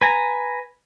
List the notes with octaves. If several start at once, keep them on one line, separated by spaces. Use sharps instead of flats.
B4 G#5 A#5